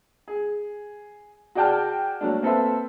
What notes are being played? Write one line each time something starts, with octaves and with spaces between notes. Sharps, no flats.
G#4
F#4 G#4 D5 G5 A5 F6
F#3 A3 A#3 D4
A#3 C4 A4 B4 C5 E5